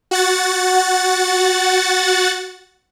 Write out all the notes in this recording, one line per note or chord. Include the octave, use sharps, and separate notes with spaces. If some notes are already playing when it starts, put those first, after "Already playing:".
F#4 F#5 A6